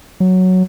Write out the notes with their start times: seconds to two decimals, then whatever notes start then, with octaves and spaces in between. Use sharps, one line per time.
0.20 F#3